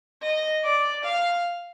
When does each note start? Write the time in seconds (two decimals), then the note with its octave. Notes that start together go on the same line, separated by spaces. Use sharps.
0.22 D#5
0.64 D5
1.04 F5